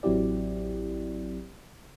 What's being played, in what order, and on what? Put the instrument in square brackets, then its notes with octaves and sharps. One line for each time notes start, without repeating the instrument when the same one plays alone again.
[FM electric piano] A1 F#3 C4 E4 G4 D5